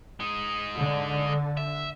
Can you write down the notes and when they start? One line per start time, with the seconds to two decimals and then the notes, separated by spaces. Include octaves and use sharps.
0.20 G#3 D#4
0.78 D3
1.57 E5